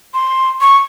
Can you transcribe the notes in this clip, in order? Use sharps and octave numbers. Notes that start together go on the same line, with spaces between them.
C6
C#6